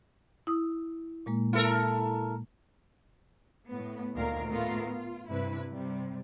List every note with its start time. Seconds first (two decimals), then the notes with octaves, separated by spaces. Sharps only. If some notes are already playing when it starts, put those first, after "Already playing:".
0.47 E4 D#6
1.26 A#2 G#3 A#3
1.53 E4 A4 A#4
3.70 A2 B3
4.15 D2 A#2 D#3 A#4 F5
4.49 A2 A3 B3 F4 A#4 F5
4.90 F4
5.29 G2 C3 E4 B4
5.68 C3 G3